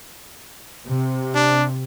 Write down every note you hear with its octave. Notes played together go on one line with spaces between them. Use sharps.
C3
D4